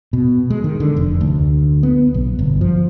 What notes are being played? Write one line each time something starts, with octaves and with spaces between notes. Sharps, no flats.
B2
G#3
D#3
D3
F1
D2
B3
B1
G1
F3